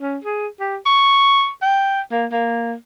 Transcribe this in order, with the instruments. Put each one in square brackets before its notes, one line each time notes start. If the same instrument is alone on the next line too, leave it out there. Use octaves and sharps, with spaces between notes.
[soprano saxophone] C#4
G#4
G4
C#6
G5
A#3
A#3